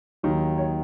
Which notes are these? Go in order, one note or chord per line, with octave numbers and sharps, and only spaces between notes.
D#2 D#3 F#3
C#5